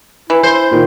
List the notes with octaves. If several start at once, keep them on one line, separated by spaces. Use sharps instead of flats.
E3 E4
C5
A#2 D#3